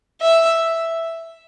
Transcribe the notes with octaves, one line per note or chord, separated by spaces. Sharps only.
E5